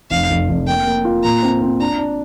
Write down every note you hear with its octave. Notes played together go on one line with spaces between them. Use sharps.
F1 F5
F1
F1
A#3 G5
A#3
F4
A#2 A#5
C4
C4
D4 A#5
D4